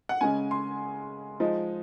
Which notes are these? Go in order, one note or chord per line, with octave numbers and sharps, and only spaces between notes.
F#5
C#3 G#3 C#4 G#5
C6
F3 G#3 D#4